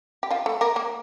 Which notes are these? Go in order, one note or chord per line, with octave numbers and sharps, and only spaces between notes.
G4
F3 F4
A3 A4
A#3 A#4
A#3 A#4